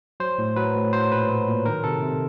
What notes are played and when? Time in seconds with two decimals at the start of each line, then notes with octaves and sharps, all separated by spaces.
0.20 F#3 C5
0.38 A2
0.56 F#3 B4
0.75 A2
0.93 F#3 C5
1.12 A#2 B4
1.29 F#3
1.47 A#2
1.66 D#3 A#4
1.84 C3 A4
2.02 C3